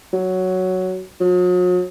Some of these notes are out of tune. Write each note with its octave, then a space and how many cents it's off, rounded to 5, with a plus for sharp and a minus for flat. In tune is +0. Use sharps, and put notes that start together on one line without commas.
F#3 +5
F#3 -45